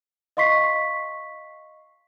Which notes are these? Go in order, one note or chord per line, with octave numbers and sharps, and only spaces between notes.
D#5 F5 C6 C#6 B6 C7